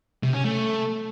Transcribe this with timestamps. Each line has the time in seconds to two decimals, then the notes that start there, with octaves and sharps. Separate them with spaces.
0.23 C3
0.34 C#4
0.45 A3